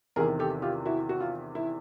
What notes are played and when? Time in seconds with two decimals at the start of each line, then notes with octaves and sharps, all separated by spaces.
0.16 E2 C3 D#3 G#4 A#4
0.39 G4 A4
0.62 F4 G4
0.85 E4 F#4
1.09 F#4
1.20 F4
1.55 E4